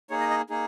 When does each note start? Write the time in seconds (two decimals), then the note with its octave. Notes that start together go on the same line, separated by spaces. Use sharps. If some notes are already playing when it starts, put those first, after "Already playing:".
0.10 A#3 D#4 G#4 C#5
0.20 D#5
0.30 D#5
0.50 A#3 D#4 G#4